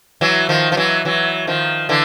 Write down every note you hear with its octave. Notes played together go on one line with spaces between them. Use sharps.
E3 F#3
D#3 F3
F3
E3 F#3
E3 F#3
D#3 F3
D3 E3